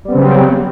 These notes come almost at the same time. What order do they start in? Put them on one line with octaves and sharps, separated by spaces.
G3 B3 C4 C#3 F#3